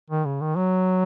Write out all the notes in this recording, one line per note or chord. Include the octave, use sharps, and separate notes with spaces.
D#3
C#3
D#3
F#3